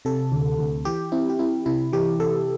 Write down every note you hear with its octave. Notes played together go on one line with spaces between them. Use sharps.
C3 A4
D2
D2
E3 G4
C4 E4
G4
C4 E4
C3 E4
E3 G4
C3 A4